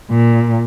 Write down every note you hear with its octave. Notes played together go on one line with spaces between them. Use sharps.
A#2